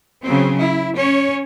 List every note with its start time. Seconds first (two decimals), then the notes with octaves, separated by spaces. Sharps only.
0.23 C#3 F#3 C4
0.59 E4
0.97 C#4 C#5